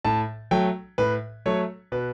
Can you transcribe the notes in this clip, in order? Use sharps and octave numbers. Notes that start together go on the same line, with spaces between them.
A2 A5
F#3 A3 G5
A2 B4
F#3 A3 C#5
B2 B4